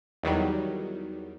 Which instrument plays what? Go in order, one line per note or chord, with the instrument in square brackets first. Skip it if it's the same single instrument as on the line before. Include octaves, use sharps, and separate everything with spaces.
[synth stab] E2 D#3 F#3 G3